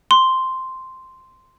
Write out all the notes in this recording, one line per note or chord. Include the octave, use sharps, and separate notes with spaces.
C6